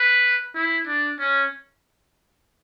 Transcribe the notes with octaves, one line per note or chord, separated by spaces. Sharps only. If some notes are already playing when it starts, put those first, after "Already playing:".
Already playing: B4
E4
D4
C#4